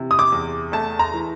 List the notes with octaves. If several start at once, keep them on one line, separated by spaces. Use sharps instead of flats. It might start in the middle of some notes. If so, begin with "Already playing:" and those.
Already playing: C3 E3
D#6
D6
E2
A3 A5
A#5
E3